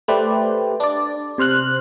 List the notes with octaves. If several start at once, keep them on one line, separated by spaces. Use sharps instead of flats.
A3 G4 B4 C5 D5
D4 D5
C3 C5 F6 F#6